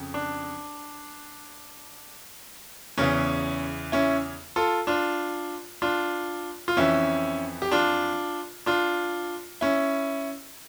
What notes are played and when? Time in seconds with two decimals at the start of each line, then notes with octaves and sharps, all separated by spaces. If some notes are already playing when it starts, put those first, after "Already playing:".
Already playing: F2 C#3
0.14 D4
2.98 E2 C#3 E3 C#4
3.92 C#4 E4
4.56 F4 A4
4.87 D4 F4
5.82 D4 F4
6.68 F4
6.77 F2 E3 C#4 E4
7.62 G4
7.72 D4 F4
8.66 D4 F4
9.61 C#4 E4